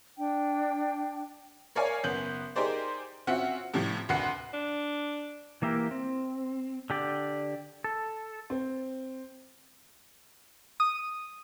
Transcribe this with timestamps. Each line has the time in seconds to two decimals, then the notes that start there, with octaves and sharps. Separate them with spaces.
0.17 D4 G5
1.75 A#4 C#5 D5 F5 G#5
2.04 F#1 B3 G6 F#7
2.56 D#4 G4 G#4 A#4 C5 D5
3.27 C4 C#4 F4 F#4 E5 F#5
3.74 A2 C3 F3 G3
4.09 F1 D2 F#5 F#6 C7
4.53 D4
5.62 E3 A#3 E4 G4 A#4
5.91 C4
6.90 D3 G4 D5
7.84 A4
8.50 C4
10.80 D#6